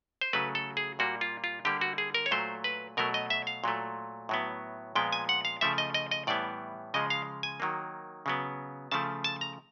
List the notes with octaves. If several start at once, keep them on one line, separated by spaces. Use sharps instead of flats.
C5
C#3 F#3 A3 B4
A4
G#4
A#2 G3 A#3 F#4
F4
F4
D3 G3 A#3 G4
F#4
G#4
A#4
C#5
A#2 F#3 A3 C5
B4
B2 F#3 A3 A#4
D#5
E5
F5
A#2 F#3 A3
A2 F#3 B3
A#2 F3 G#3 B3 G5
G#5
F#5
F5
C#3 F3 A3 E5
D#5
D#5
D#5
A2 E3 G3 B3 D5
C#3 F3 G#3 D#5
F5
G#5
D#3 F#3 A#3
C#3 F#3 B3
C#3 F3 A3 A5
A5
A#5